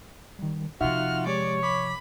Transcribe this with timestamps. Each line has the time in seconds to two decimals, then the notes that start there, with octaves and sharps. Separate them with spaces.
0.39 D#3 G3
0.81 C3 F3 D#4 F4 F#4 E5 F#5 F6
1.26 G#3 G4 C#5 D5
1.63 B5 D6